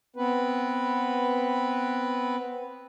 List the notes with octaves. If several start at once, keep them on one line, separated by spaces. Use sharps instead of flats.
B3 C4 B4